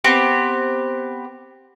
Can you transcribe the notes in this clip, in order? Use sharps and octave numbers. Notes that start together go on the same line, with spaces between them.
B3 C4 G4